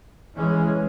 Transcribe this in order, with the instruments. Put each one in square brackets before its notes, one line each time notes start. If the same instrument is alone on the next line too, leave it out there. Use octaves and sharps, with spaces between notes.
[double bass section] E3 G#3 C#4